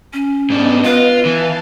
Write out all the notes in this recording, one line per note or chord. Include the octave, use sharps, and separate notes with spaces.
C#4
G#2 B3 D4 D#5
F4 B4
E3 F5 A5